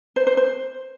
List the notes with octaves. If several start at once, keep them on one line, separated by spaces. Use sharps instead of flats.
C5
C5
C5